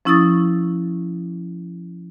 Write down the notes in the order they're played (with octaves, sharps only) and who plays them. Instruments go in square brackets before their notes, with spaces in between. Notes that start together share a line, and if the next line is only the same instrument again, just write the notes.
[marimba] F3 C#4 E4 C#6 D#6 A6